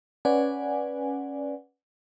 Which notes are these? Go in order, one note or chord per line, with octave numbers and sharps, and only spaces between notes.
C#4 B4 D5 F#5 G#5